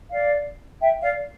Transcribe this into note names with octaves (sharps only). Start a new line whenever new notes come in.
D5 F5
E5 G5
D5 F5